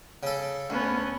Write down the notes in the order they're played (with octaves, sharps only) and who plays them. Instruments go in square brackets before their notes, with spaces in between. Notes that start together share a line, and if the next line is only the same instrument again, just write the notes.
[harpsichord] C#3 A4
[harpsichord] D2 [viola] B3 C#4